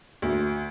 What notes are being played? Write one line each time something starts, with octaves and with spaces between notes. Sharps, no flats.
D2